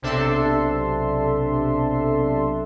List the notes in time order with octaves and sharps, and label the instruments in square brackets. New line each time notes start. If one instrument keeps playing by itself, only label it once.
[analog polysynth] B1 C3 D4 A4 E5 C6